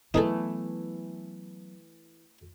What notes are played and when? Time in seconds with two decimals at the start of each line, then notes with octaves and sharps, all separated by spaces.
0.14 E3 F#3 A3 B3 D#4 G#4 A4